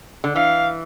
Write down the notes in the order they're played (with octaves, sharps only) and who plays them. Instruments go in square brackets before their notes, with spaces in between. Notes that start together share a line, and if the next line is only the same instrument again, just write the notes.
[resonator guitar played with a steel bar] D3
[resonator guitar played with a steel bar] E3 [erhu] F5